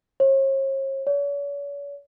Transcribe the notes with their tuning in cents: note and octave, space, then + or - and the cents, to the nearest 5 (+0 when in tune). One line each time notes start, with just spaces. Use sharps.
C#5 -45
C#5 +40